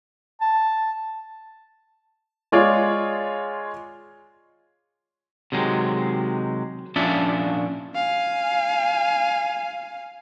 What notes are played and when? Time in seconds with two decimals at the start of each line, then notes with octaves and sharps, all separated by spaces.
0.41 A5
2.52 G#3 F4 G#4 C#5 D5
5.52 C3 D#3 F#3 G#3
6.96 A#2 F3 C#4 D4 E5 A5
7.96 F5 G#5